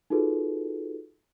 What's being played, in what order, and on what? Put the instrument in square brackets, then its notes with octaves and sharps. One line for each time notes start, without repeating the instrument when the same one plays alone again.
[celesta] D#4 F4 F#4 G#4 A4 B4